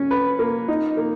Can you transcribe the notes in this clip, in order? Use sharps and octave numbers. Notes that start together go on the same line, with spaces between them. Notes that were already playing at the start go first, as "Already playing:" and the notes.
Already playing: C#4
B4
A#3
D#4
A#3